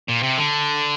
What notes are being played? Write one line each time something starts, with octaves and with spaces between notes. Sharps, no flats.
A#2
C3
D3